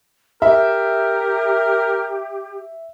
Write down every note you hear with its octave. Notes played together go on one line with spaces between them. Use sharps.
G4 A#4 E5